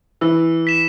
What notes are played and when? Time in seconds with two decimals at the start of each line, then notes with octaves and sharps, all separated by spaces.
0.21 E3 E6
0.67 B6 E7